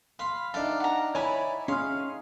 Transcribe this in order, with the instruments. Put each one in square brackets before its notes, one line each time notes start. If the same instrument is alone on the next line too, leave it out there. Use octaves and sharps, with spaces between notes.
[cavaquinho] F5 [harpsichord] B5 C6
[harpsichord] D4 A4 [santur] D#4 E5 G5 [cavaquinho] F5
[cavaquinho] F#5 A#5
[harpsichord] E4 [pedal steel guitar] C#5 B5 [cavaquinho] D5 G#5
[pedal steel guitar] C#4 F6 [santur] G#4 [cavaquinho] F5 [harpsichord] C6
[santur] G#5